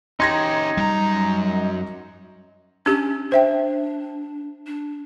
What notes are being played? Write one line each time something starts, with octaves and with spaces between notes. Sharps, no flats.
C#4 D#4 G4 C6 G#6 A#6
F#2 G3 A#5
C#4 D4 G4
D4 C5 E5 G5
D4